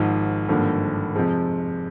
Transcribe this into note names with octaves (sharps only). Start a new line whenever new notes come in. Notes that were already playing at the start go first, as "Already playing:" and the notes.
Already playing: G#1 G#2 F3
G#1 G2 D3 F3 A#3
F2 C3 F3 G#3